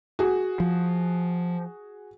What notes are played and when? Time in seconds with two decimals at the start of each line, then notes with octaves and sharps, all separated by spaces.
0.19 F#4 G#4
0.60 F3